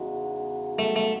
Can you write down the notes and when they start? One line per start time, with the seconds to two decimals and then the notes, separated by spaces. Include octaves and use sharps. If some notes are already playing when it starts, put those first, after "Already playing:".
Already playing: E2 C#3 G#3 D#4 F#4
0.79 A3
0.96 A3